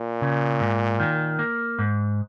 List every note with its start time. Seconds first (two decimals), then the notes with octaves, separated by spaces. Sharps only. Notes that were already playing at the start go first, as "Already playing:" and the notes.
Already playing: A#2
0.22 C#3
0.60 G#2
1.00 D#3
1.39 A#3
1.79 G#2